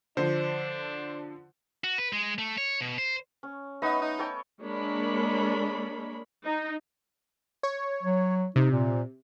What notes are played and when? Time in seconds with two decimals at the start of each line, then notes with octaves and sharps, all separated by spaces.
0.17 D3 F3 D4 C5
1.84 F#4
1.98 B4
2.13 G#3
2.38 A3
2.58 C#5
2.81 B2
2.98 C5
3.43 C#4
3.82 A3 B3 D#4 D#5
4.01 D#4
4.19 A4 C#5 G5
4.63 G#3 A#3 D4 A#4 C#5 B5
6.44 D#4
7.63 C#5
8.03 F#3
8.56 C3 D#4
8.71 A#2